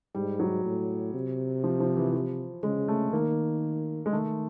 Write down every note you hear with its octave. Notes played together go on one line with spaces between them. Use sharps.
G#2 G3
F#3
A2
C3
F3
F3
E3
F3
C#3 G#3
A3
D#3 A#3
G#3
D#3 A3